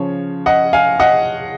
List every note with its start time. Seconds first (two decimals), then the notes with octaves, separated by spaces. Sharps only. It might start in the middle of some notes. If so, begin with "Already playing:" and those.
Already playing: C#3 F3 C#5
0.46 D#5 F#5
0.73 F5 G#5
1.00 D#5 F#5